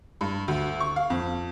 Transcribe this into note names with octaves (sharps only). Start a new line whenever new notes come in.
G2
D2
C#6
F5
F2